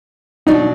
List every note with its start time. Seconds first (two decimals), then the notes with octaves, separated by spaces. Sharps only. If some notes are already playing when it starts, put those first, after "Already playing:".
0.47 B2 F#3 D4 D#4